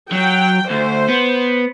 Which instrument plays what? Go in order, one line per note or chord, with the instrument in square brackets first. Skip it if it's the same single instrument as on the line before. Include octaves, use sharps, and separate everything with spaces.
[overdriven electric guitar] F#3 [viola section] G5
[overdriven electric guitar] D2 [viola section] C5
[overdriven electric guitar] B3